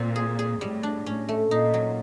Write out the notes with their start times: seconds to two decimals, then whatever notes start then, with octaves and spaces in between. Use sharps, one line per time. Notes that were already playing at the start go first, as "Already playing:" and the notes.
Already playing: A#2 C4
0.16 G#4
0.39 G#4
0.60 A2 G3
0.83 D4
1.06 A2 C#4
1.29 A3
1.51 A#2 D#4
1.74 F#3